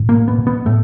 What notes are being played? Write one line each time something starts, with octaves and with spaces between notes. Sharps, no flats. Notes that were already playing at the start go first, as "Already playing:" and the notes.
Already playing: A2
A#2 A#3
B3
A#2
B3
A2 A3